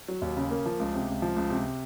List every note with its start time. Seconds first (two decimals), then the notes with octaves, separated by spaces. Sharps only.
0.08 F#3
0.22 D#2
0.37 C#3
0.51 A#3
0.66 F3
0.80 C#2
0.94 C3
1.09 C#2
1.22 F3
1.36 C#2
1.50 C3